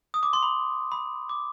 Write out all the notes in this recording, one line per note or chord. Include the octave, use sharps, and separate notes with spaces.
D#6
D6
C6
B5
B5
D6